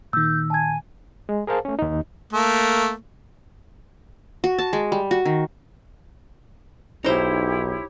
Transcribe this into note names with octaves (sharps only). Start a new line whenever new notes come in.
A#2 D#3 E6 G6
G#5 A5 G#6
G#3
G#4 A#4 C5 F5 A5
A3 C#4
D#2 D#4
A3 A#3
F#4
A5
G#3
G3
F#4
D#3
B1 D#4 E4 G4 C5 C#5